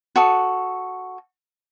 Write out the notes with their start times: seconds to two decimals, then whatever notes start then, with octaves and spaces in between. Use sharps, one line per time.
0.16 F#4 A4 D#6